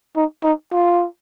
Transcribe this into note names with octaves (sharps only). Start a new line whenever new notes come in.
D#4
D#4
F4